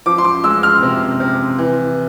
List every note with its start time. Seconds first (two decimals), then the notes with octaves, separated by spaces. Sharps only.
0.06 F3 D6
0.18 C6
0.24 D6
0.44 G#3 E6
0.63 F6
0.83 C3
1.20 C3
1.59 E3